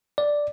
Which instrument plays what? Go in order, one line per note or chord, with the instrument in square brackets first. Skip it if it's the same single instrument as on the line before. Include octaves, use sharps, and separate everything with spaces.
[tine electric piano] D5